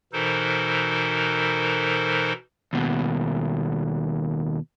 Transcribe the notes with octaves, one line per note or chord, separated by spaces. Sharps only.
B2 E3 D#4 A4 A#4 C5
D#2 B2